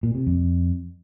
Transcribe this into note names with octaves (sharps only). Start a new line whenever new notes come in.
A#2
C3
F2